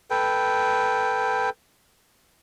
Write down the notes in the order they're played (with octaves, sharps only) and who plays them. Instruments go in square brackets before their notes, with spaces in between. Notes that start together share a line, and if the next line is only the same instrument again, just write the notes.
[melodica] A4 B4 G5